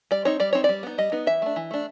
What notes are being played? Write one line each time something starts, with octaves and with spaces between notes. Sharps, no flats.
G3 D5
C4 D#4 C#5
G3 D5
C4 D#4 C#5
G3 D5
B3 D#4
G3 D#5
B3 D#4
E3 E5
A3 D4
E3
A3 D4